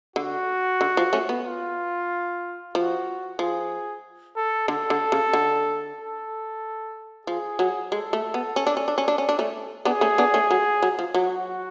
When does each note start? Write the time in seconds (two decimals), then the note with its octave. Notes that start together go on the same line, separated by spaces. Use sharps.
0.16 D3 F#4
0.81 D3
0.97 F3
1.13 A3 C#4
1.29 B3
1.46 F4
2.75 F3 F#4
3.39 F3 G#4
4.36 A4
4.68 D3 A4
4.90 D3
5.12 C#3
5.33 D3
5.97 A4
7.27 F3 G#4
7.59 F#3
7.91 G#3 A4
8.13 A3
8.34 B3
8.56 C#4
8.67 D4
8.77 C#4
8.88 D4
8.98 C#4
9.08 D4
9.18 C#4
9.29 D4
9.39 A3 C#4
9.85 B3 D4 G#4
10.01 A3 C#4
10.18 B3 D4
10.34 A3 C#4
10.51 F#3
10.83 F#3
10.99 F3
11.14 F#3 F#4